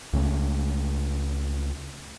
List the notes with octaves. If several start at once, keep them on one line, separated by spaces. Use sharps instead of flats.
C#2 C#3 A3